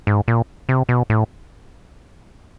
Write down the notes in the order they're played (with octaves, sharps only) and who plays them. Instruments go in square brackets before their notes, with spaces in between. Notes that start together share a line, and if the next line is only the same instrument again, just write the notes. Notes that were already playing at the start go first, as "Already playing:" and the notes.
[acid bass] G#2
A#2
C3
B2
A2